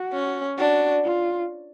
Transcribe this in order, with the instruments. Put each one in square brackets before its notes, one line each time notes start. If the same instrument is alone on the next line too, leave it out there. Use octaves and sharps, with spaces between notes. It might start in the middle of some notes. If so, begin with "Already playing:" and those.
Already playing: [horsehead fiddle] F#4
[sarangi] C#4
[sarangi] D4 [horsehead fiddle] F#4
[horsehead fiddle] F4